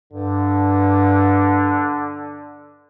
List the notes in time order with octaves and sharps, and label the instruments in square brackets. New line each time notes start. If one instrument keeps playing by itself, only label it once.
[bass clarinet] G2 [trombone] D3